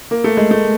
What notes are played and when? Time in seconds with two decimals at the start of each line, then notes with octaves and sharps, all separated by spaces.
0.11 A#3
0.24 A3
0.37 G#3
0.51 A3